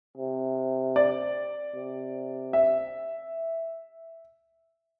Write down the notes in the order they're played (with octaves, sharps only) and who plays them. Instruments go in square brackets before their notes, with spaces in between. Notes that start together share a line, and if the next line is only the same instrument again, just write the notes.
[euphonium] C3
[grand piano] D5
[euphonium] C3
[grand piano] E5